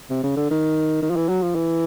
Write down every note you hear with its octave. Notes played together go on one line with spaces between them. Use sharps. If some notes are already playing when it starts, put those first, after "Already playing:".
C3
C#3
D3
D#3
D#3
F3
E3
F#3
F3
E3